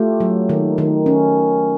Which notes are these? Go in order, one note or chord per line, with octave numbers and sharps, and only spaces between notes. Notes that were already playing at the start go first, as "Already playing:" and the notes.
Already playing: A3 F4 G4
F#3
D#3
D#3
C#4